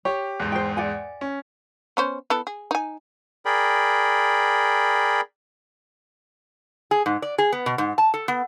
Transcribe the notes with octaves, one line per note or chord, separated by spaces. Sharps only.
G4 C#5
E2 G#2
C5 G5
D5 F#5 G#5
C#4
B3 C#4 C5
B3 E4 A4
G#4
D#4 G#5
G#4 A#4 D5 G5 B5
G#4
G#2
D5
G#4
B3
B2
G#2
A5
A4
B3